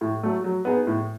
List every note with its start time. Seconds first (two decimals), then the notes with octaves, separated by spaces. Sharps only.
0.01 A2
0.23 F#3 A3
0.44 F#3
0.65 B3 D#4 G#4
0.87 A2